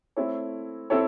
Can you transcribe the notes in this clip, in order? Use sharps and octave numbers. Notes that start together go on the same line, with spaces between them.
A3 C4 E4 A4 C#5
C4 E4 A4 C#5